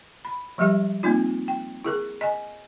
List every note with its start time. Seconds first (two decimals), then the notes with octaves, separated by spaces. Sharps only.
0.25 B5
0.58 F3 G3 G#3 G4 E5
1.03 A#3 C4 D#4 F4
1.48 G5
1.84 E4 G#4 A#4
2.21 D#5 G#5